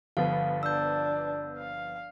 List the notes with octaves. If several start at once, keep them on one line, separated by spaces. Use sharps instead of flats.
G1 F3 B3 F5
D4 E6 G6
F5